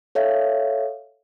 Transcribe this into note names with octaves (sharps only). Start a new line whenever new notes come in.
A4 C#5 E5 F5